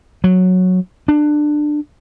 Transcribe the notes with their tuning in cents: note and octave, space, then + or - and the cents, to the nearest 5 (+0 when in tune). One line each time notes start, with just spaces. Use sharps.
F#3 -10
D4 +20